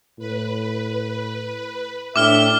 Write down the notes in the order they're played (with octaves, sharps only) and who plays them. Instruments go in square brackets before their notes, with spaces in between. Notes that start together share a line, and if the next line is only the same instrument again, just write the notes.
[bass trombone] A2 [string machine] B4
[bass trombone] A2 [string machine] D4 [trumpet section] G4 E5 [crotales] D6 F6 G7